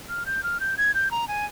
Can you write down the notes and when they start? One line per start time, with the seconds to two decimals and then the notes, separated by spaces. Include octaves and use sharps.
0.09 F6
0.26 G6
0.43 F6
0.60 G6
0.77 G#6
0.94 G6
1.11 A#5
1.28 G#5